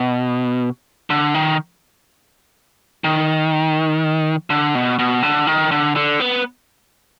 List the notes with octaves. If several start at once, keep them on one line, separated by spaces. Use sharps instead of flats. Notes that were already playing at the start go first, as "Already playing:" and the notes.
Already playing: B2
D3
D#3
D#3
D3
B2
B2
D3
D#3
D3
D3
B3